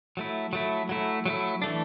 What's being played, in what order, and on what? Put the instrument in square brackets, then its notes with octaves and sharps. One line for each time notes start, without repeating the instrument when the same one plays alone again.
[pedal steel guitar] F#3 A3 E4
F#3 A3 E4
F#3 A3 E4
F#3 A3 E4
E3 A3 D4